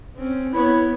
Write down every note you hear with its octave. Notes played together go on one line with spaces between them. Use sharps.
C4 C#4
B3 E4 C#5